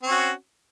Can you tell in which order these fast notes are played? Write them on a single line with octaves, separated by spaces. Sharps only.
C4 C#4 F#4